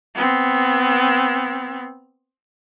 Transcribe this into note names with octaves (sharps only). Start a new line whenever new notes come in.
B3 C4